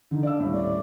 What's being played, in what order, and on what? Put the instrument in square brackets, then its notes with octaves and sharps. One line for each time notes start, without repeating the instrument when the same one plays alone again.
[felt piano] D3 [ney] D#4
[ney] D4 [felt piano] D5 F5 E6
[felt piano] D#1 A2
[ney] D5